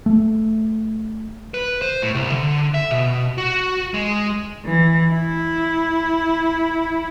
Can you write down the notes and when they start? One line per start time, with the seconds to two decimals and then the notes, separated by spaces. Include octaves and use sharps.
0.06 A3
1.54 B4
1.82 C5
2.02 A2
2.15 C2
2.31 D3
2.74 E5
2.91 B2
3.38 F#4
3.94 G#3
4.65 E3
5.10 E4